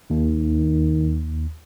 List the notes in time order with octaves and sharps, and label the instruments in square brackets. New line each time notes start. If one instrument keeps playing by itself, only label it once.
[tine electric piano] D#2 [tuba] D#3